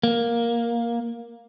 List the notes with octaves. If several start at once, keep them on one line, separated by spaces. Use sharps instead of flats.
A#3